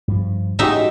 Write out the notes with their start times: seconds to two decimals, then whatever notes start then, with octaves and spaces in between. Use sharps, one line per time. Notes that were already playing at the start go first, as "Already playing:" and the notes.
0.08 G2 F3
0.59 A2 G#3 D#4 F#4 G4 E5